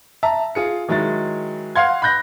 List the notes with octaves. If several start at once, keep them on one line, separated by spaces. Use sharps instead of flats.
E5 A5 A#5
F4 G#4 C#7
D#3 F#3 G#3 E4 A6
F5 F#5 C6 G#6
B5 F#6 G6 A#6